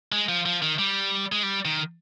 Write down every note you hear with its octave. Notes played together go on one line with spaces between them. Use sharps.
G#3
F3
F3
D#3
G3
G#3
G3
D#3